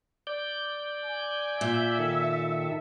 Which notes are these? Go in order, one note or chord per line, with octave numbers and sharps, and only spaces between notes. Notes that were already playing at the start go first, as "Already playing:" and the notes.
D5 G6
G#5
A#2 E5
D#3 A4